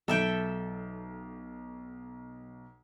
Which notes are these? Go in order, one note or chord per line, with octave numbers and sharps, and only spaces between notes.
B1 F#3 A4 E5 G5